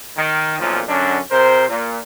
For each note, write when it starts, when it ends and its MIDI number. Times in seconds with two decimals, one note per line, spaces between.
0.17 0.58 51
0.59 0.82 35
0.59 0.82 42
0.59 0.82 46
0.59 0.82 53
0.89 1.19 42
0.89 1.19 50
0.89 1.19 61
0.89 1.19 62
1.31 1.66 48
1.31 1.66 70
1.31 1.66 72
1.68 1.99 46